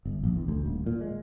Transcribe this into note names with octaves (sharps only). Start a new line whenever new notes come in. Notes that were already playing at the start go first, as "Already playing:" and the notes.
G1
A#1
E2
D2
D#1
A#2
G#3